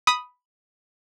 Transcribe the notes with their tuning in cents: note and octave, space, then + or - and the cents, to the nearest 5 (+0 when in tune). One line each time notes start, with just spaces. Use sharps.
B5 +0 D#6 +0